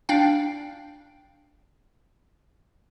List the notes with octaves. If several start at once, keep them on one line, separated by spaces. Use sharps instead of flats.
D4 F5 G5